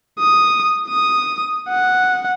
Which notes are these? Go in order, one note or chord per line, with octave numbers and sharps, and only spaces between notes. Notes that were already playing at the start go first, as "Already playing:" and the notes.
D#6
D#6
F#5